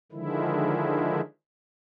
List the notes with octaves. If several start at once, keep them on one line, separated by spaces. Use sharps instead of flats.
D3 D#3 F3 G#3 E4